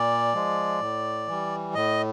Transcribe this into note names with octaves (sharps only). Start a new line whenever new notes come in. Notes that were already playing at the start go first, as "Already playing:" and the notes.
Already playing: A#2 D5
F3 G#3
A2
E3 G3
A2 D#5